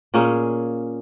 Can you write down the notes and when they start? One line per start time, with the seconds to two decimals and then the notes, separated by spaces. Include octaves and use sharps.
0.14 A#2 A#3 C#4 G#4